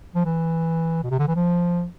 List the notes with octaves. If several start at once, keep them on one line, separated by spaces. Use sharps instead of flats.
F3
E3
B2
C3
D3
E3
F3